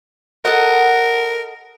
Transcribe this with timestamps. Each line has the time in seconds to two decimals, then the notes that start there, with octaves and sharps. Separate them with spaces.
0.45 A4 A#4 D#5 F#5